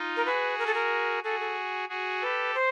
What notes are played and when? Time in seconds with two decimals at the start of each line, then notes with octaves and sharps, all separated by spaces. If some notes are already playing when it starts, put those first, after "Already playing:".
Already playing: D#4 F4
0.17 A#4
0.26 F#4 G#4 B4
0.59 A#4
0.67 A4
0.74 A#4
1.24 F#4 G#4 A4
1.40 A4
1.89 F#4 G#4
2.21 G4 A4 B4
2.55 C5